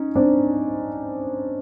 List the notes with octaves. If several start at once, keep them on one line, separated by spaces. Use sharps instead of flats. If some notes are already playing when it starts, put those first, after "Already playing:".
Already playing: C#4 D#4
C4 D4